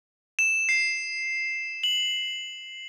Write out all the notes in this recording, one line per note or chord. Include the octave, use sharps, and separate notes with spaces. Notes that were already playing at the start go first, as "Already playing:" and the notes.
E7
C7
F#7